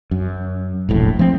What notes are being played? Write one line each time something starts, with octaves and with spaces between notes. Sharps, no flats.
F#2
E1 A#1 A2
F3 A3 C4